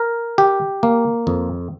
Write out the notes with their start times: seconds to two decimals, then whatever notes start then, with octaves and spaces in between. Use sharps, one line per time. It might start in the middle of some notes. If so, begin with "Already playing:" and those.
Already playing: A#4
0.38 G4
0.83 A#3
1.27 F2